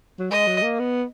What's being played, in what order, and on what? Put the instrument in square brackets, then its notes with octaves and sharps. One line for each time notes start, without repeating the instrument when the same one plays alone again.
[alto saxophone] F#3
[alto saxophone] G#3 [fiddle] D#5
[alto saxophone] F#3
A#3
B3